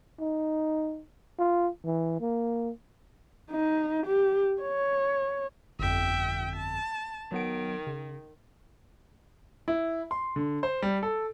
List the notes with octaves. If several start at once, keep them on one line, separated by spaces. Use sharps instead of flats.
D#4
F4
E3
A#3
D#4
G4
C#5
G1 F2 E5 G5
A5
D#3 F#3 B3 D7
C#3
E4
C6
D3
C5
G3
A4